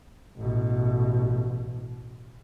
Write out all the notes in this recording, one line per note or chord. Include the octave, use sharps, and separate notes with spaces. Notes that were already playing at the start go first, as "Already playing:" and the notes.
A1 B2